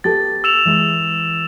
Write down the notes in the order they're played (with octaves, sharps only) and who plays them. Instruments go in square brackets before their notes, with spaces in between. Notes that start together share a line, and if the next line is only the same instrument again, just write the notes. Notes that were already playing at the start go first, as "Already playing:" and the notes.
[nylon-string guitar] B3 G4 A4 [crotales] A6
[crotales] E6 E7 F7
[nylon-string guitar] E3 G#3